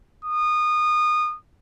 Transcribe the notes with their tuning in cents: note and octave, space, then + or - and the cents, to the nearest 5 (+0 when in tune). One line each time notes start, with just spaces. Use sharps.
D#6 -25